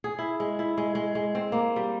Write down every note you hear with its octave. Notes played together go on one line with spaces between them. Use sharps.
G#4
E4
G#3
E4
G#3
G#3
G#3
C4
A#3
G3